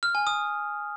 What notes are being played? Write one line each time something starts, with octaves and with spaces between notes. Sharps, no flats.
F6
G#5
D#6